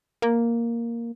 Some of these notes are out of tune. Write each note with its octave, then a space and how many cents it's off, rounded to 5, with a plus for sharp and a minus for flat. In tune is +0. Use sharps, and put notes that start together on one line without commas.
A#3 +0